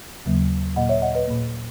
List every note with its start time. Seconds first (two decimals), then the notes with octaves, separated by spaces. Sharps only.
0.26 D#2 C#3 F#3 A#3
0.76 A#2 A#3 D#5 F#5
0.89 C#5 E5
1.02 D#5 F#5
1.15 B4 D#5
1.27 A#2 A#3